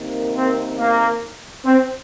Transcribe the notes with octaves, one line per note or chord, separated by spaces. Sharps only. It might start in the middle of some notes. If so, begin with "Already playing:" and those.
Already playing: C3 D#3 A#3
C4
A#3
C4